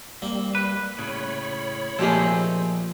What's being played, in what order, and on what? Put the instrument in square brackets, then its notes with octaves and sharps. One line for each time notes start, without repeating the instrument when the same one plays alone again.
[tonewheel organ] G3 [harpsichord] A#3 C4
[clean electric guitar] B4
[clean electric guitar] A2 C#3 [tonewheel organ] C#5 B5
[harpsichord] A#2 G#3 A3 [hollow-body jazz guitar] F3 G4 G#4 [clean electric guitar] C4